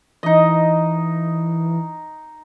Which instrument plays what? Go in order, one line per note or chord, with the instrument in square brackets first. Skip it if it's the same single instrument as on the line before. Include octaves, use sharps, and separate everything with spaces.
[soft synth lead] E3 [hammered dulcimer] D#4 D#5